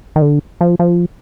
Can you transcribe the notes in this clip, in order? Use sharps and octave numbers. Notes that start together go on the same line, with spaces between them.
D#3
D3
F3
F3